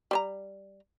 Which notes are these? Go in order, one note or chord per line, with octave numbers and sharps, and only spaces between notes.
G3 C5 A#5